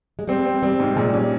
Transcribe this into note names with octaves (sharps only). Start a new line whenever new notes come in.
G#3
G3 C4
C4
G3 C4
G#2
A#2 G#3
G3 C#4